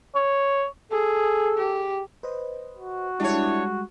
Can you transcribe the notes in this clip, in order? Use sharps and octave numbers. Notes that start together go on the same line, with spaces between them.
C#5
G#4 A4
G4
B4 C5 D#5
F#4
G3 G#3 D4 E4 G4 C#5